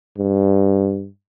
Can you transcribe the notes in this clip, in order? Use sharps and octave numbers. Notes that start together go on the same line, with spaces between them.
G2